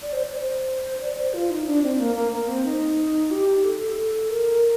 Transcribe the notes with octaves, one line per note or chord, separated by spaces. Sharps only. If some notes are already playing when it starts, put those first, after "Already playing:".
D5
C5
D5
C5
D5
C5
F4
D#4
D4
C4
A#3
A#3
A#3
C4
D#4
G4
A4
A#4